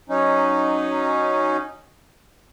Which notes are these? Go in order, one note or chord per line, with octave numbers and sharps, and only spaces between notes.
F#3 C#4 D#4